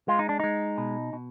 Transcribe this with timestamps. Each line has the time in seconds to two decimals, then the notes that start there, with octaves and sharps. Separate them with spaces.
0.08 G#3 F4
0.19 D#4
0.29 D4
0.40 G#3 D#4
0.78 B2
1.13 B2